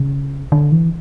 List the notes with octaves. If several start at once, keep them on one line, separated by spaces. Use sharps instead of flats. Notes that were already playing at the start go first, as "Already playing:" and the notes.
Already playing: C#3
D3
E3